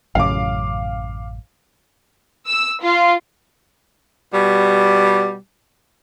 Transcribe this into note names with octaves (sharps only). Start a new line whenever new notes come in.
A1 F#2 C#3 F5 D6
E6
F4
B2 G3